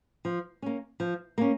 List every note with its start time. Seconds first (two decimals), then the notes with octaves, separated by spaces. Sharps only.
0.25 F3
0.62 A#3 C#4
1.00 F3
1.38 A#3 C#4